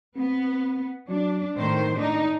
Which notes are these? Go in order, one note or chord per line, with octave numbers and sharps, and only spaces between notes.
B3 C4
F#3 D4
G#1 A2 D#3 C5
D4 D#4